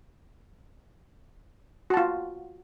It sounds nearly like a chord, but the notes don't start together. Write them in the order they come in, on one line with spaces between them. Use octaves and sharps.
F#4 A5 F4